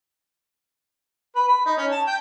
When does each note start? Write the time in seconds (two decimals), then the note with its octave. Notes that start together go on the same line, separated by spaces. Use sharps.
1.35 B4
1.48 B5
1.66 D#4
1.78 C#4
1.90 A5
2.07 G5